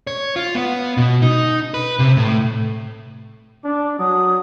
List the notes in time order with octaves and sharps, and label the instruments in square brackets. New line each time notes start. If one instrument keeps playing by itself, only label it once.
[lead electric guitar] C#5
F4
B3
B2
D#4
B4
C3
A2
[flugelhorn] D4 [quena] D6
[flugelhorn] F#3 [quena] D#6